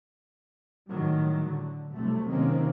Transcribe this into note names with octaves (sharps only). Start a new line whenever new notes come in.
A2 D#3 F#3 G3
D3
F1 C3 F#3 G3 A3
C3 D#3 F#3 A#3 C4 C#4